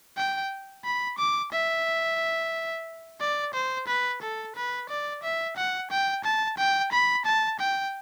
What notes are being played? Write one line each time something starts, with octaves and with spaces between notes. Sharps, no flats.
G5
B5
D6
E5
D5
C5
B4
A4
B4
D5
E5
F#5
G5
A5
G5
B5
A5
G5